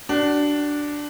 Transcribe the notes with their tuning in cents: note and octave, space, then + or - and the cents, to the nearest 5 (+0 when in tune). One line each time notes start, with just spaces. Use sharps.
D4 +0 F#4 +40